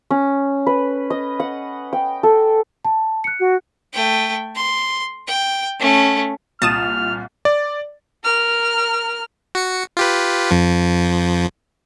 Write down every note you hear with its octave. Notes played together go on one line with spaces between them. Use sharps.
C#4
B4
D#5
F#5
G5
A4
A5
F#6 C#7
F#4
A3 G5
C6
G5
A3 C#4
C2 A#2 A5 D#6 F6 E7
D5
A#4 F6
F#4 C#7
F4 G4 B4
F2 F3